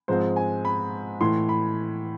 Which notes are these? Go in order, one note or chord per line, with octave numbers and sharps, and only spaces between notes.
G#2 F3 G#3 C4 C5
G#5
B5
A2 E3 A3 C6
B5